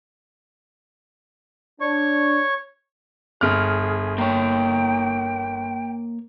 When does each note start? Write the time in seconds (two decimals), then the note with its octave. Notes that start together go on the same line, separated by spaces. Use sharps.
1.81 D4 C#5 C#6
3.41 G1 G#4 F6
4.18 A#3 C#5 G5